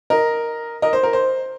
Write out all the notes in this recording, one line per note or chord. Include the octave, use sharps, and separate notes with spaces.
A#4 D#5
A#4 D#5
C5
A#4
C5